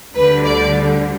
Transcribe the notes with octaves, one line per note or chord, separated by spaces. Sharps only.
D2 D3 G3 B4
D5